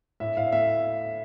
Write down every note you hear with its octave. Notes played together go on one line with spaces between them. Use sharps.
A2 E5
A2 F5
A3 E5